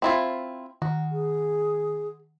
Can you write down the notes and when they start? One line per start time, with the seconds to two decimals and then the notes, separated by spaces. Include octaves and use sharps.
0.02 C4 E4 F4
0.82 D#3 F#4
1.11 G#4